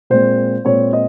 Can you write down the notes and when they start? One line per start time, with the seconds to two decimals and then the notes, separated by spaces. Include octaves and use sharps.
0.10 A#2 G#3 C4 C5
0.65 A#2 G#3 C4 C#5
0.93 D#5